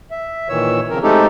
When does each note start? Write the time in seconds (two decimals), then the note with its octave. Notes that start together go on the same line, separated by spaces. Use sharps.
0.11 E5
0.49 A#2 D#3 E3 C#5 E6
0.90 C#3 F3 C4 A#4
1.03 G#3 A3 C4 D#4 G4 A4